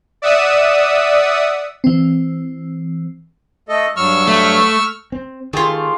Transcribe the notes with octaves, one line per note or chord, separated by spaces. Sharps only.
D5 E5 F#5 D#6 E6
E3 C4
A3 A4 D#5
G2 F#3 C#6 E6 F6
A3
C4
D#3 A3 F4 G4 G#4